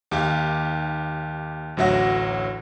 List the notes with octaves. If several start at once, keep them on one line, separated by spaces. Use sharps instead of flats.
D#2 G4 F5
A1 D2 F#3 E5 F#5 A#6